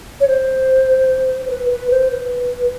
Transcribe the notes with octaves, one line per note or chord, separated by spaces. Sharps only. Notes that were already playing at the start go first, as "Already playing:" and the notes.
C#5
C5
C5
B4
B4
C5
B4